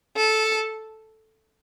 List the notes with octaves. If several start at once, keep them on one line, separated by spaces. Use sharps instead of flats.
A4